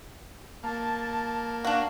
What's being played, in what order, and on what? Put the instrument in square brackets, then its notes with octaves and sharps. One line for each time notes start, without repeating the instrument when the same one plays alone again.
[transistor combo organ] A#3 [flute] A5
[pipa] D4 F#4 [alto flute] F5